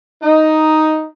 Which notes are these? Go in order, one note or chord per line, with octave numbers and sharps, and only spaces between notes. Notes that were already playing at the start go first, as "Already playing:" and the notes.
D#4